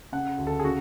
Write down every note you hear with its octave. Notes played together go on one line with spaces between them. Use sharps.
C#3 F#5
D2
A4
G#4
C#3 F#4